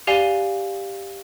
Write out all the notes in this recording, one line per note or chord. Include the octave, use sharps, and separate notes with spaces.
G4 D5 F5 G#5 D#7 G7